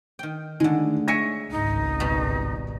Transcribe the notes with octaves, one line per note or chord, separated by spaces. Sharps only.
D#3 G5
D3 D#3 G#3 A3
C#5 E5 G#5 A#6 C#7
G#1 C#2 G#2 D#4
B2 G3